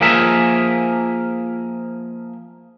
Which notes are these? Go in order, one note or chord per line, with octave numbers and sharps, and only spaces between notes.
F3 A#3 G#4 A#4 E5